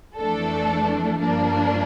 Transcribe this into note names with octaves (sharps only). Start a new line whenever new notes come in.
F2 E3 A3 D4 A4
G2 F3 A#3 D4